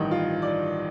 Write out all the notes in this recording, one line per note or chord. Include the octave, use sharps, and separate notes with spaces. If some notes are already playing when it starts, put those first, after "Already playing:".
Already playing: A1 G2 D#3 D#4
F4
D5